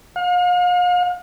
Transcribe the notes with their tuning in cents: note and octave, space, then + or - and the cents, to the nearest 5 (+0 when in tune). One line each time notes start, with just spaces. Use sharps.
F5 +40